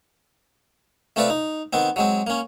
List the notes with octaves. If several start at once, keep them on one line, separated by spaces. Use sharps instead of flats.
A3 C4 F4 B4 D5
D#4
D#3 B3 C4
F#3 G#3 C4
A#3 C#4